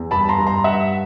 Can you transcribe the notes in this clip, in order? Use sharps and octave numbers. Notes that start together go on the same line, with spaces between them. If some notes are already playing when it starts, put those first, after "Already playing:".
Already playing: E2
G2 A5 B5
A#5 C6
G2
A#5 C6
G2 E5 F#5